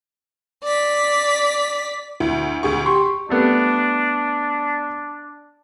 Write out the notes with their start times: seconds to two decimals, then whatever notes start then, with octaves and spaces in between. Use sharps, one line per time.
0.63 D5 B6
2.20 D2 E4
2.63 D2 G#4 C#6
2.86 G4 C6 C#6
3.29 G3 A3 B3 D4